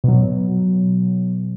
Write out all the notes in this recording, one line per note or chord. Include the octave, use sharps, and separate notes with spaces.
B2 F#3